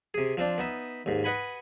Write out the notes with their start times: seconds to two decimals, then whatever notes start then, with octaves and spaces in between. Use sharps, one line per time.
0.14 C3 G#4
0.37 F3 C4 D4
0.58 B3 D#4 E5
1.06 D#2 G#2
1.24 B4 D#5 F#5 G#5 B5